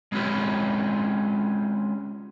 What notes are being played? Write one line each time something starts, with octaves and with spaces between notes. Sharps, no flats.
G#3 C4 C#4 F4 G4 B4